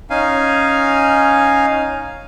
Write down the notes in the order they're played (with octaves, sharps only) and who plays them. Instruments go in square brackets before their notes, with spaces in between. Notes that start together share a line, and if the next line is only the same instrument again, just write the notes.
[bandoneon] C#4 D#4 F5 G#5